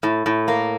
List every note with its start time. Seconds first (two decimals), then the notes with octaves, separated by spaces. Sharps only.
0.03 A2
0.26 A2
0.48 A#3